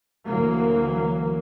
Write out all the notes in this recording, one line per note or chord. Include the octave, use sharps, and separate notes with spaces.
D2 E3 F#3 A#3